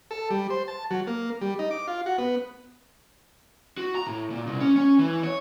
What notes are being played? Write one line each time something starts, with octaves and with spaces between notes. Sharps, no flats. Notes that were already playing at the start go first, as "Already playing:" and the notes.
A4
G3
C5
A5
F#3
A#3
G3
D#4
D6
F4
F#4
B3
F#4
A#5
A2
A#2
C2
C#4
C#4
E3
C#5